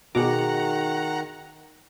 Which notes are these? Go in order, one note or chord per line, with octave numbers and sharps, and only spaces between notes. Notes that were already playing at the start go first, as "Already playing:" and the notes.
B2 D#3 F#4 G#4 F#5 A#5 D6